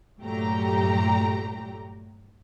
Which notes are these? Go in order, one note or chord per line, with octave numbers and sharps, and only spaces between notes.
G2 A#2 F#3 A3 G4 A#5